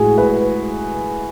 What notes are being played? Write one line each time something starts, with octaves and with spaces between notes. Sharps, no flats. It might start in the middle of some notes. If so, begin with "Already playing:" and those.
Already playing: A2 G#3 F#4 G#4
B4